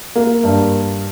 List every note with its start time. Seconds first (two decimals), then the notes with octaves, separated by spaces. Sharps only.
0.15 A#3
0.43 G2